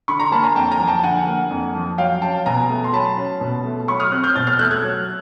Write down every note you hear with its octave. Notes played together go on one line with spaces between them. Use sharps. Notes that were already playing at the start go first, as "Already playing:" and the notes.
D3 B5 C#6
A#5 C6
A#3 A5 B5
G#5 A#5
F2 G5 A5
G#5 A#5
F3
G5 A5
D3 F#5 G#5
A#3
F2
F3
F#3 F5 G5
C#4 G5 A5
B2 G#5 A#5
A3
C6
F#3 A5 B5
C#4
B2
A3
F#3 B5 C#6
D#6 F6
C4 F#6
F6 G6
B2 G6 A6
F6 G6
A3 E6 F#6
F#6 G#6
F#3